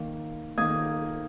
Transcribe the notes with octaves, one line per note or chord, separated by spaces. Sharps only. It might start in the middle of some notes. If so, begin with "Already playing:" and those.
Already playing: D#3 A#3
D#3 A#3 D#6 G#6